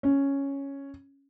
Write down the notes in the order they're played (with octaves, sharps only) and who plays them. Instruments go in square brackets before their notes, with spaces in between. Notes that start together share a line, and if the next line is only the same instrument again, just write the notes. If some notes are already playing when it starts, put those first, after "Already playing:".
[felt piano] C#4